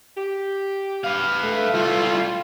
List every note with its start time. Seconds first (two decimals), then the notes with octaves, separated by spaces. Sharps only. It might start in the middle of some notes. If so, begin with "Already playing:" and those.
0.17 G4
1.04 B4 F5
1.44 A3
1.74 G3 E4 F4